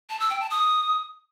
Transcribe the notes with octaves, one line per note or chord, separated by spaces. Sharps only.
A5
E6
G5
A5
D#6